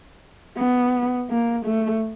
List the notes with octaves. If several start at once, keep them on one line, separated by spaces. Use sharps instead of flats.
B3
A#3
A3